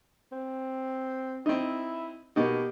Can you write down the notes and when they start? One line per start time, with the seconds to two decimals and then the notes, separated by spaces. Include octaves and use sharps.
0.32 C4
1.46 C4 D#4 E4
2.36 B2 A#3 D#4 G4